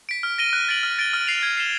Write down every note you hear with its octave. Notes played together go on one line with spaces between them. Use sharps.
B6 D7
F6
A#6 D#7 G7
F#6
A6 D7 F#7
F6
A6 D7 G7
F6
A6 C7 F7
G#6
C7 E7 G7